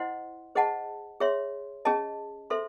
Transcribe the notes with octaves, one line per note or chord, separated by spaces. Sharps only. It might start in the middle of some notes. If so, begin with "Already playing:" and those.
Already playing: E4 C5 D#5 F#5 C6
G#4 C5 D#5 F#5 A5
G#4 C#5 E5 C6
C#4 G#4 D#5 A5
A4 C5 E5 C6